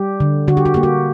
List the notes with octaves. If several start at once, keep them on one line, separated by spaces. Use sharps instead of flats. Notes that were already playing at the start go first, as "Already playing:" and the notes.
Already playing: G3 G4
D3
D3 F#4
G4
F#4
A#3 G4
F#4